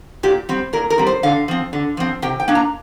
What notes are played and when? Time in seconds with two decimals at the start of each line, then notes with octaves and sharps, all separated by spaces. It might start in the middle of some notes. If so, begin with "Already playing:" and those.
0.23 A#2 G4
0.49 G3 C4
0.73 A#2 A#4
0.90 A#4
0.98 G3 C4
1.07 C5
1.23 D3 F5
1.48 F3 C4
1.73 D3
1.97 F3 C4
2.22 C3 G5
2.40 G5
2.48 A#3 D4
2.55 A#5